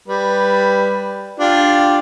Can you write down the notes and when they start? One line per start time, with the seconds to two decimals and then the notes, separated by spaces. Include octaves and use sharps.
0.08 G3 B4
1.40 D4 F4 G4